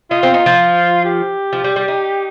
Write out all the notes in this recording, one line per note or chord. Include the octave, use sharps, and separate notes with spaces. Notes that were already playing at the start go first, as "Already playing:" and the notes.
D#4 F4
C4
D#4
F3
G4
F3
G3
G3
D#4